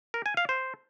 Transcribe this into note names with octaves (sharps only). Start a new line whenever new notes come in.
A#4
G#5
F5
C5